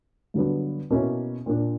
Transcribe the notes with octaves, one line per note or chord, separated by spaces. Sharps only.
G2 D3 F#3 B3 D4
B2 A#3 C#4 E4
A#2 A#3 D4